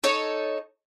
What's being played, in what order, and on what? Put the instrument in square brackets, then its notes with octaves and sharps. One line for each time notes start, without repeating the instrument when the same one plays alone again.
[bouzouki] D#4 A4 C#5